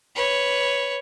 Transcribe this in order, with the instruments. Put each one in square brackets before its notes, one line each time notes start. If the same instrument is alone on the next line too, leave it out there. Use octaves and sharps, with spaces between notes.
[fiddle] B4 C#5